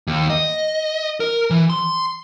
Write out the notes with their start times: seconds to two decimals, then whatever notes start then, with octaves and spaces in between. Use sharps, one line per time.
0.07 D#2
0.30 D#5
1.20 A#4
1.50 E3
1.70 C6